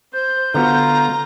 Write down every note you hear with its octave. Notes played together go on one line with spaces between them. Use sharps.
C5 G6
D3 B3 F4 F#4 A#5